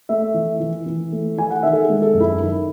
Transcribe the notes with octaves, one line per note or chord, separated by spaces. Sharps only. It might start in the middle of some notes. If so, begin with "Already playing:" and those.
A3 E5
E3
E3
E3
A3
E3 G#5
F#5
D#3 E5
A4
G#4
G#3
A4
F#2
E4
D#3